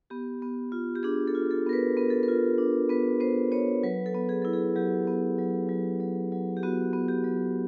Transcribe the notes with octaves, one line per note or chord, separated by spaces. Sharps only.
B3 G4
B3
F4
G4
D4 G#4
A4
F4
A4
B3 A#4
B4
B3 A#4
A4
A#4
F4
D4
B3 B4
B3 C5
B3 C#5
F#3 B4
A4
B3
G#4
E4 A4
G#4
F#3 G4
B3
F#3
F#3
F#3
F#3
G4
B3 F#4
B3
G4
F#3